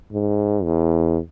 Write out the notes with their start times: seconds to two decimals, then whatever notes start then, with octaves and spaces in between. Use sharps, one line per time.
0.13 G#2
0.64 E2